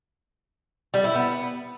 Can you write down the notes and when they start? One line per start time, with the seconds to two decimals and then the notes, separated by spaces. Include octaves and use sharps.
0.94 G3
1.04 E4
1.15 B3